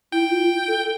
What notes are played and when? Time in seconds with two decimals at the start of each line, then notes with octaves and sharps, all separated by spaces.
0.12 E4 G5
0.31 F4
0.68 A4